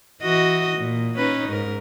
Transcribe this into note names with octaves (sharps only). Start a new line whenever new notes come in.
E3 F#4 D#5
A#2
C#4 D#4 B4
G#2 A#4